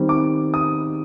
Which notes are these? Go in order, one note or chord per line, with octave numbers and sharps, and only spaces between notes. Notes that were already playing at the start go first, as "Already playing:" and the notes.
Already playing: D#3 G3 C4
D6
D#6